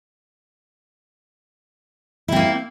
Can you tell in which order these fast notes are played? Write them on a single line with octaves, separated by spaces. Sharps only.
E4 C4 A#3